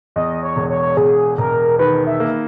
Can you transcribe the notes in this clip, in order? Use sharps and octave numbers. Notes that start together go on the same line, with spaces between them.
E2 D#5
C#5
E1
C#5
E1 G#4
E1 A#4
D#3 B4
E5
A#3